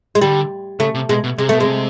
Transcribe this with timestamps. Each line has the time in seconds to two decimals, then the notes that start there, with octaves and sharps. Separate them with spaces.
0.15 G#3
0.22 D3 G3
0.79 C#3 A3
0.95 C3
1.09 B2 G#3
1.24 B2
1.38 C3 G#3
1.49 B2 A3
1.60 C3 G#3